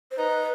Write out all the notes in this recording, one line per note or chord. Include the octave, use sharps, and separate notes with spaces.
C5
D#4 B4